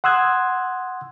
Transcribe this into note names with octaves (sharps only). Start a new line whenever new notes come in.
F#5 C6 D#6 E6 F#6 G#6